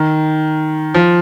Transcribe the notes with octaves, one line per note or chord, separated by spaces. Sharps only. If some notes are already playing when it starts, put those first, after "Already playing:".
Already playing: D#3
F3